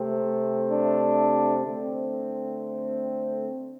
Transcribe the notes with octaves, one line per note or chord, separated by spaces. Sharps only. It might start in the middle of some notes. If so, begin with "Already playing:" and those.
Already playing: C3 A3 C4
D4
D3 A3 C4